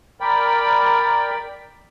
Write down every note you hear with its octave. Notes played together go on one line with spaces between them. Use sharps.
A#4 D5 G5 B5